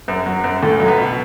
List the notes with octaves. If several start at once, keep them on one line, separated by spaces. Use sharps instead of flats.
F#2
F#3
F#2
C#2 A3
F#3
B3
B2